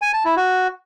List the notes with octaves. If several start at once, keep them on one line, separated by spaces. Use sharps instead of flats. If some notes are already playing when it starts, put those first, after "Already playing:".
G#5
A5
E4
F#4